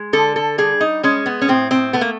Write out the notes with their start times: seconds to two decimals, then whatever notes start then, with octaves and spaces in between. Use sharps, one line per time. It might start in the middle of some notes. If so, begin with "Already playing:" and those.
Already playing: G#3
0.13 D3 A4
0.36 A4
0.58 G3 G#4
0.81 D#4
1.03 G#3 C#4
1.26 B3
1.42 C#4
1.48 A2 C4
1.71 C4
1.93 A3 B3
2.01 A#3